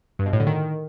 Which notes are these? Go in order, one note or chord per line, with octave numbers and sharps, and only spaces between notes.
G2
B2
A2
D3
D#3